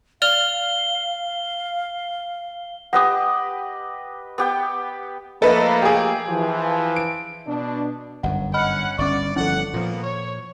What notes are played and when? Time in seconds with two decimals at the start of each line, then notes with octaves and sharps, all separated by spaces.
0.22 D5 F5 F6 F7 G7
2.93 G4 B4 D#5 F#5 D#6
4.38 B3 G4 G5
5.42 F3 A3 A#3 A4 B4 D#5
5.82 G4 G#4
6.28 E3 F3
6.96 D7
7.47 B2 D4
8.23 G1 F#2 F#5
8.54 C#4 D#5 F#5 B5 F6
8.98 G1 C#4 D5 C#6 D6
9.36 G1 F3 C#4 E4 A4 F#5
9.74 A#2 F3 A#3 B3
10.03 C#5